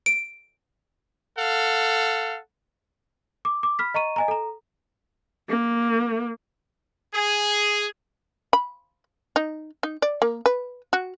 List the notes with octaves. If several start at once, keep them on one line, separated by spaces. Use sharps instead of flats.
D7
A4 F5 F#5
D6
D6
B5 F6 B6
D#5 A#5 C#6 D#7
D#5 G#5 A#5
A4 A#5
A#3
G#4
B5
D#4
D#4
D5
A#3
B4
F#4